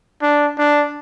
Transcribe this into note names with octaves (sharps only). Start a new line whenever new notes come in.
D4
D4